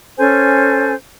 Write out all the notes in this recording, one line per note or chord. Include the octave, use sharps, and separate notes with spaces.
C#4 A4 C5 G#5